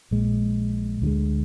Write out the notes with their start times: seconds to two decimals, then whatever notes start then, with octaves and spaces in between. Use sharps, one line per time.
0.11 A#1 A#2 G#3
1.02 D2 D3 F3 G#3